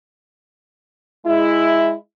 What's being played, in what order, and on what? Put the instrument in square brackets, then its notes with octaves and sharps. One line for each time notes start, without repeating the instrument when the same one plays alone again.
[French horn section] G#3 E4